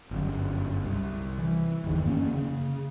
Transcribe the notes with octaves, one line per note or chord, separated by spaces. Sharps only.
G1 F#2
C2
E3
G1 E2 D#3
F#2 A#3 C4 C#4
C#3